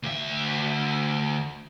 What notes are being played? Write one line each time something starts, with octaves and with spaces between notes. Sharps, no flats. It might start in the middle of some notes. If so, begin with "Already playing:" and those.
D2 E5